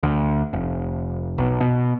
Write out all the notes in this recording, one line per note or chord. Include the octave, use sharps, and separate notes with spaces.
D2
F1
B1
B2